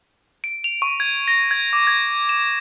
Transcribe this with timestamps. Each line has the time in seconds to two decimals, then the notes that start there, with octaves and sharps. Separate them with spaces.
0.44 D7
0.64 F7
0.82 C#6
1.00 G#6
1.28 A#6
1.51 G#6
1.73 D6
1.87 G#6
2.29 E7